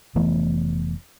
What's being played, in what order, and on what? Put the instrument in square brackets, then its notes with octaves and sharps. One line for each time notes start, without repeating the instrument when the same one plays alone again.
[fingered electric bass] F1 E3 A3 B3